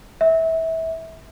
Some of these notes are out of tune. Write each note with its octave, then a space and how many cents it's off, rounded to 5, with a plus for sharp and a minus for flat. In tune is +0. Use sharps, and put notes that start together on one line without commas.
E5 -25